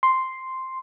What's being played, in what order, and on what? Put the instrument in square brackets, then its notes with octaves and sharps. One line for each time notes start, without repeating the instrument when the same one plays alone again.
[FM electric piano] C6